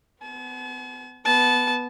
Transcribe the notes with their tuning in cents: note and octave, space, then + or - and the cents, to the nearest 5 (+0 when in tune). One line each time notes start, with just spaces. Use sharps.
B3 +35 A5 -45
B3 +0 A5 -20